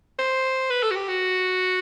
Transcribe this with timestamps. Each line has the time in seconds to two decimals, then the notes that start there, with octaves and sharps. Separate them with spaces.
0.19 C5
0.70 B4
0.83 A4
0.91 F#4
0.96 G4
1.09 F#4